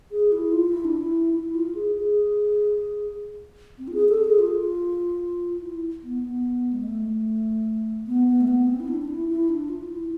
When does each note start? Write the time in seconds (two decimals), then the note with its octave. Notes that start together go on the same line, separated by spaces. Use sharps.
0.12 G#4
0.32 E4
0.52 F4
0.73 E4
0.84 D4
0.97 E4
1.34 E4
1.55 F4
1.75 G#4
1.96 G#4
3.79 C4
3.88 F4
3.94 G#4
4.09 A4
4.24 G#4
4.39 F4
5.62 E4
6.03 B3
6.23 B3
6.73 G#3
6.84 A3
8.07 B3
8.27 B3
8.41 A3
8.48 B3
8.67 C4
8.80 E4
8.88 D4
9.02 D4
9.09 E4
9.28 E4
9.49 D4
9.69 F4
9.90 E4